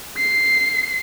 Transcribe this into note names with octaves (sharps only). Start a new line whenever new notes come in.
C7